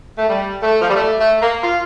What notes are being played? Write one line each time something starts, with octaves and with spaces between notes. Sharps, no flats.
A3
G3
A3
F3
G3
A3
A3
A#3
F4